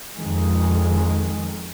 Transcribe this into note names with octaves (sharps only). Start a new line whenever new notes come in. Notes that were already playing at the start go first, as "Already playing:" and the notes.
F2 D#3 G#3